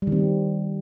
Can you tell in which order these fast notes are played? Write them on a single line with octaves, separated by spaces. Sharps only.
G3 D#3 C4